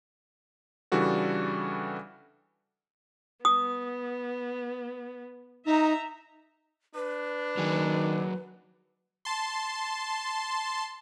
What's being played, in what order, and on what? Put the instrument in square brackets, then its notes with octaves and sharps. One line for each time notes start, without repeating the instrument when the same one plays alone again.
[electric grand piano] C#3 E3 G3 D4 F#4 A4
[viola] B3 [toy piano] D#6
[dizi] D#4 [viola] E5 A#5
[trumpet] D4 [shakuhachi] B4
[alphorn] D#3 [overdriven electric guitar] F#3 G#4
[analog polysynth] A5 C6